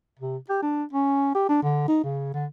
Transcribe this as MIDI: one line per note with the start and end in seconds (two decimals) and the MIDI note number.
0.19 0.37 48
0.49 0.58 67
0.62 0.84 62
0.93 1.33 61
1.35 1.48 67
1.49 1.59 62
1.63 1.88 50
1.88 2.03 63
2.04 2.31 49
2.34 2.46 50